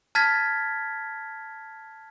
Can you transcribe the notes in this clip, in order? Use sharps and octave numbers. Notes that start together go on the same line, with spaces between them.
A5 F6 G#6 A6 B6